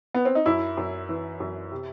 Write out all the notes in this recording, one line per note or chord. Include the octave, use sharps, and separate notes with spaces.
B3
C4
D#4
F#2 E4
F#2
E3
F#2
C3